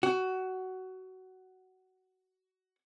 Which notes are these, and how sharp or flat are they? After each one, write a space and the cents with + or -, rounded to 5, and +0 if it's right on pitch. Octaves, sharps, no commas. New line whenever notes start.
F#4 +15